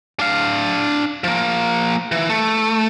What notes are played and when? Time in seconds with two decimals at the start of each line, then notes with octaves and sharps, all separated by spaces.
0.19 D4 F5
1.24 F3 A#3
2.12 E3
2.29 A3